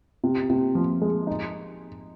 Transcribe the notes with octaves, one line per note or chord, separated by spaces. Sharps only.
C3
C3
F3
G#3
D#4